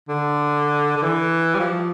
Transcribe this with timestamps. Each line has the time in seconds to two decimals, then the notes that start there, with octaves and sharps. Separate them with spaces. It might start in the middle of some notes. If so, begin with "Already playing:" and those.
0.09 D3
0.96 D3
1.03 E3
1.55 G3
1.59 F3